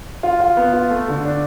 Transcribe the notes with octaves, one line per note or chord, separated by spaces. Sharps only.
F4
F4
B3
F4
A3
D3
D4